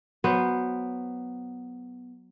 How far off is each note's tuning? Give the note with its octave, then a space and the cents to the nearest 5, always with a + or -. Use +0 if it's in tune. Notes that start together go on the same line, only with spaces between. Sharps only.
F#3 +0 B3 +0 C5 +0